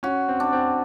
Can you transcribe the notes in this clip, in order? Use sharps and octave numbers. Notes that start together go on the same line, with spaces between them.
C#4 F#4
C4
D4
C4